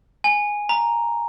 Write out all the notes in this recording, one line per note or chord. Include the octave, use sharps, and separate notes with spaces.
G#5
A#5